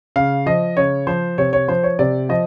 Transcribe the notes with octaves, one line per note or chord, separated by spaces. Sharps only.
C#3 F5
F3 D#5
C#3 C#5
F3 C5
C3 C#5
C#5
F3 C5
C#5
C3 D5
F3 D#5